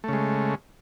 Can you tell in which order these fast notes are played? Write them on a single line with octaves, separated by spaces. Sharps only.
A3 C#3 G#3